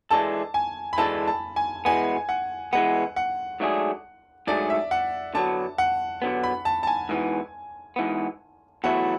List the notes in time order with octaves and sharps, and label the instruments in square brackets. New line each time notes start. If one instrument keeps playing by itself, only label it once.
[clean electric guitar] E3 G#3 D4 A4 [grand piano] A5
[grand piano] G#5
B5
[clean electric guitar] E3 G#3 D4 A4 [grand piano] A5
[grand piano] A5
G#5
[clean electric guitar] E3 G#3 B3 [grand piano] G#5
[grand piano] F#5
[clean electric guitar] E3 G#3 B3 [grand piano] F#5
[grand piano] F#5
[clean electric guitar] G#2 F#3 A3 D4 G#4
[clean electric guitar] G#2 F#3 A3 D4 G#4 [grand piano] D5
[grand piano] E5
F#5
[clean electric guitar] D3 F#3 B3 [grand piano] A5
[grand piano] F#5
[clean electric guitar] D3 F#3 B3
[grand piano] B5
A5
A5
G#5
[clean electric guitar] G#2 E3 B3
G#2 E3 B3
[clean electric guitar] E2 B2 F#3 A3 E4 [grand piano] F#5